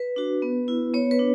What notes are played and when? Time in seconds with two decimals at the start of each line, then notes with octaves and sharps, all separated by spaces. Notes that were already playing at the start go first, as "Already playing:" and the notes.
Already playing: B4
0.16 D4 F#4
0.42 B3
0.68 E4
0.93 B3 C#5
1.11 B4
1.19 D4